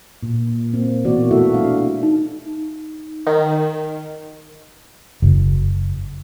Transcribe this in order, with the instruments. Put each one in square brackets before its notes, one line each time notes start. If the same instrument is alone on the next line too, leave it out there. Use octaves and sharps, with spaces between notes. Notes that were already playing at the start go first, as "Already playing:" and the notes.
[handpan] A#2
A#3 C4
B2 E3 A#3 F#4 D5
A3 E4 F#4 A4 E5
G3 A3 D4 F5
[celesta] D#4
[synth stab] D#3
[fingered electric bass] F#1